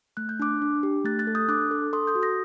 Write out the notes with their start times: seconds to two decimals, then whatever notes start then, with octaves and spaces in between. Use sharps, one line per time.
0.17 A3 F#6
0.29 G6
0.40 D4 D6 F#6
0.62 D4
0.83 G4
1.05 A3 F#6 A6
1.19 F#6 A6
1.27 A4
1.35 D#6 G6
1.49 D4 D6 F#6
1.71 A4
1.93 A4 C6 D#6
2.07 D#6 G6
2.15 F#4
2.22 G6 A#6